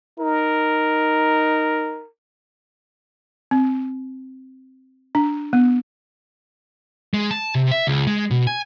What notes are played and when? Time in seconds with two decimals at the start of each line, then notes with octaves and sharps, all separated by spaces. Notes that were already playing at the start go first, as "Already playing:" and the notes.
0.19 D#4 A#4
3.51 C4
5.15 D4
5.53 B3
7.14 G#3
7.31 A5
7.55 C3
7.71 E5
7.87 C#2
8.07 G#3
8.31 B2
8.47 G#5